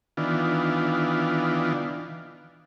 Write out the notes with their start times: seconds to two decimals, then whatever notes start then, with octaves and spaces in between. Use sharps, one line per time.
0.17 D#3 E3 B3 D4 F4